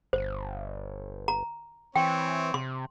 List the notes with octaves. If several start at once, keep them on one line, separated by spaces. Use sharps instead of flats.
G1 C5
A#5
E3 C4 C#5 G5
C3 C6